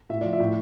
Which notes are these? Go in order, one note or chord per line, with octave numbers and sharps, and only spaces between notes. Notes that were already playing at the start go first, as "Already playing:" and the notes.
A2 E5
F3 D5
E5
A2